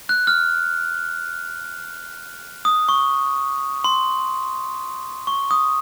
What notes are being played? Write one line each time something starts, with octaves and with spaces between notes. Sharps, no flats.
F#6
F6
D#6
C#6
C6
C#6
D#6